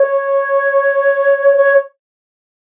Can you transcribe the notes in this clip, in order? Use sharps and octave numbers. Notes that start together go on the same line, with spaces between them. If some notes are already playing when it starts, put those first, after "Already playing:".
Already playing: C#5
C#5